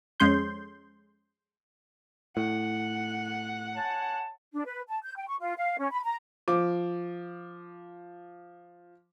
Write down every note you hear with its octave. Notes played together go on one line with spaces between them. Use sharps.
F2 G#3 C#4 C6 G6
A2 F#5
C#5 G#5 A5
D4
B4
A5
G6
G5
C#6
F4
F5
C#4
B5
A#5
F3 D6